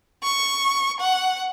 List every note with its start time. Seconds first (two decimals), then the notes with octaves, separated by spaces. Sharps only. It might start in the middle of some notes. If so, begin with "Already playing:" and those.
0.24 C#6
1.01 F#5